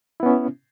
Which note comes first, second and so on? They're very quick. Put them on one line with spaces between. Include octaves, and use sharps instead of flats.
E4 B3 C#4